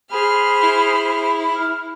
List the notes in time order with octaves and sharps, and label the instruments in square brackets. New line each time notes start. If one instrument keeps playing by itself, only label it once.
[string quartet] G#4 C5 F6 [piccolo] B5
[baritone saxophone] E4
[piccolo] F6